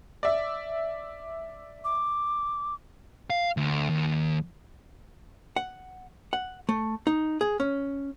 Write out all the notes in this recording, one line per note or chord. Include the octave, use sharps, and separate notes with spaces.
D5 E5
D6
F5
D2
D#2
F#5
F#5
A3
D#4
G#4
C#4